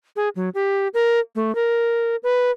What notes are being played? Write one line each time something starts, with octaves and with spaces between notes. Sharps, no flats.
G#4
F#3
G4
A#4
A3
A#4
B4